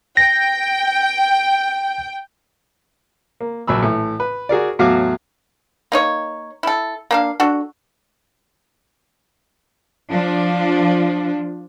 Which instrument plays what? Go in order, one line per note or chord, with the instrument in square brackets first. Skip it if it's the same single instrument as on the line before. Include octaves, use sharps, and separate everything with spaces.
[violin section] G5 [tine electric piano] A#6
[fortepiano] A#3
A#1 F#3 B5 E6
A2 E3
B4
F#4 G#4 A#4 D5
E2 A2 F#3 F#4 F5 D6
[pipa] A#3 D#4 C#5
E4 A4
A#3 D4 F5
D4 F#4 A4
[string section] F3 D4